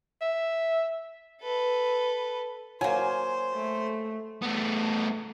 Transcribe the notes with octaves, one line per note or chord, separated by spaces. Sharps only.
E5
A4 B4
F#3 A#3 C5 G#5
A3
A3 B3